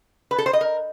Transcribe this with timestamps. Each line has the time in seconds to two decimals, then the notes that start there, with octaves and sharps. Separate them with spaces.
0.31 B4
0.38 A4
0.46 C5
0.53 D#5
0.61 A#4